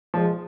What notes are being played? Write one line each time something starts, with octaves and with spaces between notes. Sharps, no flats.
F3 G#3